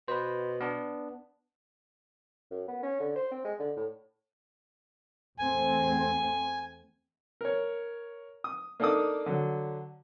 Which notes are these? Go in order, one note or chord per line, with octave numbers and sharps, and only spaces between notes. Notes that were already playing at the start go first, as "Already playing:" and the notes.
B2 B4 C5
B3 D4
F#2
B3
C#4
D3
C5
C4
G#3
D3
A2
E2 A3 C4 G#5
A#4 C#5
D#6
A#3 D4 D#4 A4 D5 D#6
D3 F#3